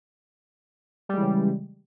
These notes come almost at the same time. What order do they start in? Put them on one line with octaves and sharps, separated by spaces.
G3 G#3 E3 C#3